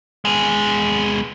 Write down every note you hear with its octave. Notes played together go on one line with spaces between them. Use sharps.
G#3 B3